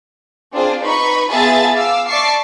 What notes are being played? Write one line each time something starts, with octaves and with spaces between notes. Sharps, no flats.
C4 D4 F4 G#4 C5 D5
D#4 B4 B5 C#6
B3 F4 G#4 E5 A5 A6
F5 D6 E6
D5 E5 A5 C#6 D6 C7